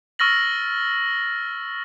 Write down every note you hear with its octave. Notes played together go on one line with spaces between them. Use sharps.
C#6 E6 F6 A6 A#6 F#7